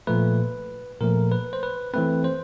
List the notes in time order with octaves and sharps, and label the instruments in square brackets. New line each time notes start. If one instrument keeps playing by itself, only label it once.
[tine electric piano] A#2 F3 A3 B4
A#2 F3 A3 A#4
B4
C5
B4
E3 A3 C4 B4
C5